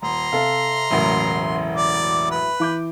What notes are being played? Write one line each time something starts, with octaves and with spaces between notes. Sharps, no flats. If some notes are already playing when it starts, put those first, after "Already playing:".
D#1 A#5 C6
C3 A4 F5
E1 A1 A2 C#3 F#3 A#4
D5
B4
E3 D6 G6